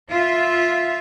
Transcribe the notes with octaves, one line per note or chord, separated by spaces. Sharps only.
F4 E5